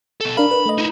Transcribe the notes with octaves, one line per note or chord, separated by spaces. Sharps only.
B2 A4
D4 A#4 F5 B5
B4
A3 D#5
D#4 E4